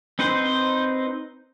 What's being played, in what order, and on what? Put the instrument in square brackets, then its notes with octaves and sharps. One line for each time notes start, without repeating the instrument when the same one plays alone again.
[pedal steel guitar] C4 D#4 B4 C5